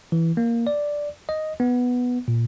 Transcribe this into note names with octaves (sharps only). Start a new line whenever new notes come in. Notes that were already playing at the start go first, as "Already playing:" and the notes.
E3
A#3
D5
D#5
B3
A#2